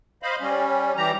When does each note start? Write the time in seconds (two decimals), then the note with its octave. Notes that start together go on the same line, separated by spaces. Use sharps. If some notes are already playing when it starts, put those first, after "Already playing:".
0.23 C5 D#5 F5 B5
0.41 G3 C#4
0.97 E3 G3 G4 A#5